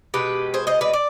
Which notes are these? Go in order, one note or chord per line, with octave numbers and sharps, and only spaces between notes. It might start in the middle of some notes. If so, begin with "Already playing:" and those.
B2 G#3 G4 B4
G#4 C5
C5 D#5
B4 D5
D5